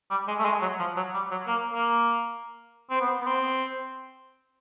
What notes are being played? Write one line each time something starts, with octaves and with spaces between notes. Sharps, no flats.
G3
G#3
A3
G#3
F#3
F3
F#3
G3
F#3
A#3
A#3
C4
B3
B3
C4